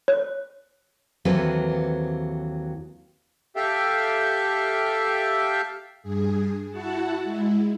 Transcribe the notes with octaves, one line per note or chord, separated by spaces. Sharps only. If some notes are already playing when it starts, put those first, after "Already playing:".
C#5 F#6
D#2 E3 F#3 C4 A4 B4
G4 A4 E5 F5 G5
G2 G#4
E4 F#4 F#5 A5
G#3 E4